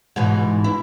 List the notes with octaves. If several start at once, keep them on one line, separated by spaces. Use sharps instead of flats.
G#2 B2 E3
E4